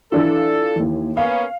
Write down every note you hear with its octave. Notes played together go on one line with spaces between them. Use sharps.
E3 D4 F4 A4
D#2 E3
A#3 B3 C#4 F5